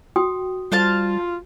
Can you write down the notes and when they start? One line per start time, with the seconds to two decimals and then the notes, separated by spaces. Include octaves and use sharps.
0.16 F#4 G5 D#6
0.72 G3 F4 C5 F5 A5